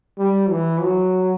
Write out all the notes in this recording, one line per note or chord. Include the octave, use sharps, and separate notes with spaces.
G3
E3
F#3